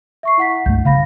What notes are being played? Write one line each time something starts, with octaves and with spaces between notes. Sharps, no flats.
E5 C#6 C7
E4 F#5 B6
C2 G2 A3 G6
C#3 F5 B5 A#6